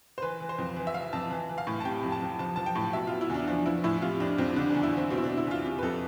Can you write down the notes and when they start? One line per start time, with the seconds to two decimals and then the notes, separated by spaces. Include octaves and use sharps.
0.18 C5
0.22 E3 B4
0.40 E3
0.49 C5
0.58 F2
0.77 E3
0.87 E5
0.94 E3 F5
1.13 F2 A5
1.31 E3
1.49 E3
1.58 F5
1.67 A2
1.80 A5
1.85 C3 G5
2.03 F2
2.12 A5
2.22 F2
2.39 F3 A5
2.56 F3 A5
2.66 G5
2.75 A2
2.93 B2 E5
3.07 B2 F4
3.21 E4
3.30 E2 D4
3.47 F3 D4
3.66 F3 E4
3.84 A2 E4
4.02 C3 F4
4.20 F2 D4
4.38 F2 C4
4.56 D3 D4
4.70 E2 D4
4.83 E4
4.92 E2 C4
5.10 B2 C4
5.17 E4
5.24 B2 D4
5.37 E4
5.47 E2 F4
5.65 C3 G4
5.78 B4
5.82 F2 A4